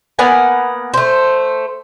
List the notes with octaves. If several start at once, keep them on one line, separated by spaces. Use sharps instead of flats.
A#3 B3 F#5 G#5
A3 C5